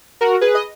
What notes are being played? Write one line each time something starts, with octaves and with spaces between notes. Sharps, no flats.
F#4 A#4
G#4 B4
D#5